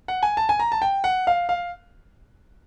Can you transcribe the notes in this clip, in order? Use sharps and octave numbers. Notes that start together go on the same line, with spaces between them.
F#5
G#5
A5
G#5
A#5
A5
G5
F#5
F5
F5